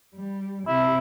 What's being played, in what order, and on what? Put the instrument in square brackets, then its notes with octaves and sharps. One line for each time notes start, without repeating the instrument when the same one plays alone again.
[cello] G3
[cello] C3 [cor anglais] E4